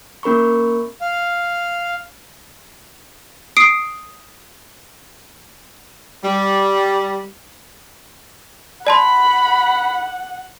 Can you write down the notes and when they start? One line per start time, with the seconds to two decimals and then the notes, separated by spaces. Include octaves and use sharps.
0.23 A#3 C#4 A#4 B5 C#6
1.01 F5
3.57 D#6 C7 D7
6.25 G3
8.87 D5 F#5 A5 B5 C6